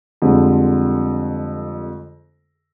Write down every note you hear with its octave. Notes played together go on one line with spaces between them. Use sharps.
F2 D3 G3 G#3